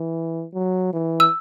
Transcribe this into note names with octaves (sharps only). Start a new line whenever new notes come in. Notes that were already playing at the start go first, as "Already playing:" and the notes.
Already playing: E3
F#3
E3
E6